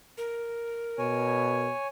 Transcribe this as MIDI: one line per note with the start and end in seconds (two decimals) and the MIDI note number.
0.18 1.67 70
0.98 1.71 47
0.98 1.87 73
0.98 1.87 80